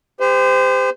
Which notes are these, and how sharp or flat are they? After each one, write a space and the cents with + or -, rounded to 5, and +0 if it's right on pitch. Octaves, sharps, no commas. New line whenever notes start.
G4 +35 C5 -30